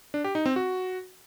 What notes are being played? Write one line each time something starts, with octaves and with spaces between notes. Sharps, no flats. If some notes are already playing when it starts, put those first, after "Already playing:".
D4
G4
D#4
C4
F#4